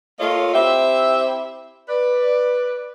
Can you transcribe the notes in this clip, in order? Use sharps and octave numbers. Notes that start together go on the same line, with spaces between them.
A3 A#3 F4 C#5 D#5 F5
C4 E4 G4 E5
B4 D5